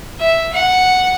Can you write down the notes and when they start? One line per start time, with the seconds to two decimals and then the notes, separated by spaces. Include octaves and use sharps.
0.20 E5
0.53 F#5